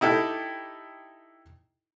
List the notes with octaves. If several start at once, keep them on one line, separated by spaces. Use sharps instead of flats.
D#4 E4 G4 A4